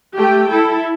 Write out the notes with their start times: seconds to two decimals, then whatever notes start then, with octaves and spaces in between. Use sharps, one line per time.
0.17 A3 G4 G5
0.51 E4 A4